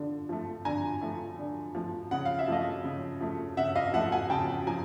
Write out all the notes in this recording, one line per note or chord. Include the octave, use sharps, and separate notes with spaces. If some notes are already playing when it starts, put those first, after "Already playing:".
Already playing: D3 F3
F3 A3
D3 G#5 A#5
F3 A3
D3
F3 A3
C#3 F#5
F5
E5
F3 A3 D#5 F5
C#3
F3 A3
C#3 E5 F#5
D#5 F5
F3 A3 E5 F#5
F#5 G#5
C#3 G5 A5
F3 G#5 A#5